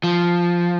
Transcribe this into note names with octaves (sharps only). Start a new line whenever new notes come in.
F3